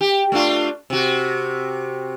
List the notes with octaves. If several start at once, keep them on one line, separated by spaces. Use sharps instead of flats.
G4
A3 D4 F4
C3 F#4